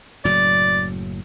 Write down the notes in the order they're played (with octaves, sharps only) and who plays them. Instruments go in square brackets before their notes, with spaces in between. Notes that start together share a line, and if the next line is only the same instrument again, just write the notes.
[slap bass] F#1 A2 F#3 [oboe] D5